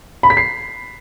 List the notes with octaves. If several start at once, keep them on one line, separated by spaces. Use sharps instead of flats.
B5
B6
C7